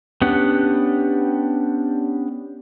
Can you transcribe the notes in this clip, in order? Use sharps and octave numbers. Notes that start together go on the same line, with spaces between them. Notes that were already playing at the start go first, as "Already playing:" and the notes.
B3 C#4 D4 G4 F#5